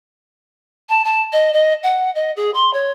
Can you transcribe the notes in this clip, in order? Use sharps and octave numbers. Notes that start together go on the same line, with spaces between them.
A5
A5
D#5
D#5
F#5
D#5
G#4
C6
C#5